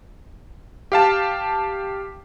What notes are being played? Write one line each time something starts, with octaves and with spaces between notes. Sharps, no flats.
G4 F5 A5